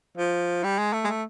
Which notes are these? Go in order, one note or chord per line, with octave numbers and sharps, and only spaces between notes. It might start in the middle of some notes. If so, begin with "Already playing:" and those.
F3
G3
G#3
A3
G#3
A3